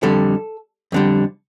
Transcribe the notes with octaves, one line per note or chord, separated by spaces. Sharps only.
F2 D3 G3 A4
F2 D3 G3